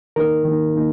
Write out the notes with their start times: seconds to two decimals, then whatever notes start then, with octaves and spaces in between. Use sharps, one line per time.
0.16 D#3 A#3 D#4 A#4
0.45 D#3 A#3 D#4
0.73 D#3 A#3 D#4